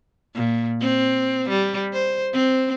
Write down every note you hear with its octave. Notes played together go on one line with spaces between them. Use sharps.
A#2
C4
G3
C5
C4